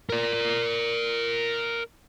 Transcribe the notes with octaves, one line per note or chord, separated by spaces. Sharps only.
A#4 D5